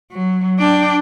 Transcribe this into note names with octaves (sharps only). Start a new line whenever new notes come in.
F#3
D4 G5